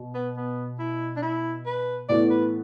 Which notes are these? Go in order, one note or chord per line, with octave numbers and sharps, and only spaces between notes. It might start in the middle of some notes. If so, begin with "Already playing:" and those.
Already playing: B2
B3
B3
E4
D4
E4
B4
A2 E3 B3 F#4 A4 D5
B4